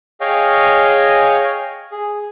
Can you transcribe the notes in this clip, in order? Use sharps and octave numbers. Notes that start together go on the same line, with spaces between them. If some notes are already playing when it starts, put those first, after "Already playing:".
G#4 C#5 D#5 F5 G5 G#5
G#4